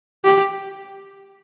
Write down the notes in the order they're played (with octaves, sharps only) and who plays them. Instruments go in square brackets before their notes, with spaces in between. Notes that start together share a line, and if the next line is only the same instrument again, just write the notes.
[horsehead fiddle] G4